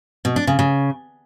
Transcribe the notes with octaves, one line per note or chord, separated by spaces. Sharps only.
B2
D4
C#3
C#3